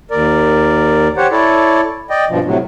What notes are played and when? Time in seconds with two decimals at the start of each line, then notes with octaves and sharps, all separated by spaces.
0.11 D#2 A#4 D5
1.17 G4 C5 C#5 F#5
1.31 E4 A4 C#5 D5
2.10 D5 D#5 G5
2.29 G2 B2 F3
2.44 A2 C3 F#3